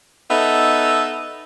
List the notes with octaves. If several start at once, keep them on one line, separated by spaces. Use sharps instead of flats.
B3 D#4 A4 E5